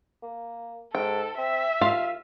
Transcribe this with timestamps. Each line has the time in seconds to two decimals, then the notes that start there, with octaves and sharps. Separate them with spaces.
0.22 A#3
0.95 G#2 A4 G5
1.38 C4 E5
1.81 D#2 F4 F5